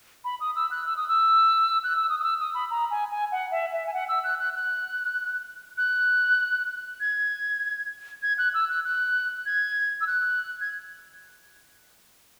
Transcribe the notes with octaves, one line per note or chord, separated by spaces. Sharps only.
B5
D#6
E6
F#6
E6
D#6
E6
F#6
E6
D#6
D#6
E6
D#6
B5
A#5
G#5
G#5
F#5
E5
E5
G#5
F#5
E6
F#6
F#6
F#6
F#6
G#6
G#6
F#6
E6
F#6
F#6
G#6
E6
F#6
G#6